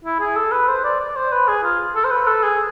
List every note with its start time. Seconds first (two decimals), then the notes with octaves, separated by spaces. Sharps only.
0.04 E4
0.20 G#4
0.36 A4
0.52 B4
0.68 C5
0.84 D5
1.00 D5
1.16 C5
1.32 B4
1.48 G#4
1.64 F4
1.96 A4
2.05 C5
2.11 B4
2.27 A4
2.43 G#4